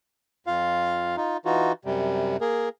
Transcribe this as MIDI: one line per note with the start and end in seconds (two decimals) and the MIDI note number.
0.47 1.16 41
0.47 1.16 65
0.47 1.16 77
1.17 1.37 63
1.17 1.37 65
1.45 1.72 52
1.45 1.72 63
1.45 1.72 65
1.45 1.72 66
1.85 2.37 42
1.85 2.37 48
1.85 2.37 55
2.41 2.69 58
2.41 2.69 68
2.41 2.69 70